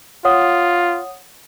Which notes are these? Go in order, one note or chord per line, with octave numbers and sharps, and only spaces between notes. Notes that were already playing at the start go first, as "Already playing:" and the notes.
F4 C#5 F#5 D#6